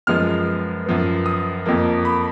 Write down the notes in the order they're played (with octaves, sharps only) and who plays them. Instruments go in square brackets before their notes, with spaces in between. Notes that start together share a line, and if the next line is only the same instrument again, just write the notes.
[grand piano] F#2 F3 G#3 B3 F6
F#2 F3 B3
D#6
F2 F3 A#3
B5